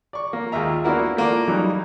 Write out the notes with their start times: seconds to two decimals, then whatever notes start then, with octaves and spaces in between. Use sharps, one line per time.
0.13 D5 C#6
0.33 A#3
0.52 D#2 G#3 F4 E5 A#5
0.84 A#3 B3 D4 E4 F#4 A#4
1.17 A3 A#3 F4 D5
1.47 C#3 E3 F#3 G3 D#4